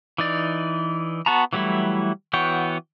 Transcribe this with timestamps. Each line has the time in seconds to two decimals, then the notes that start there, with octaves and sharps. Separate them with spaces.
0.18 E3 D#4 D5
1.26 B3 F#4 A5 A#5
1.53 E3 F#3 G3 A3 E4
2.33 E3 B3 F#4 C#5 G5